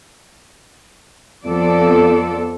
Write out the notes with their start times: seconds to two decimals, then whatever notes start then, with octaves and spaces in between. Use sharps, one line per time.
1.45 F2 F3 B3 A4 D5